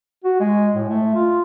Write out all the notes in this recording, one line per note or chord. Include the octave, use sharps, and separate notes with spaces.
F#4
G#3
A2
A3
F4